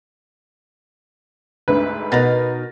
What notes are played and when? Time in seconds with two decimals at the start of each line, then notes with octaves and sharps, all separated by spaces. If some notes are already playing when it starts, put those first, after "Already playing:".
1.68 D2 G#2 D3 B4
2.12 B2 B3 D#4 A#4 A6 A#6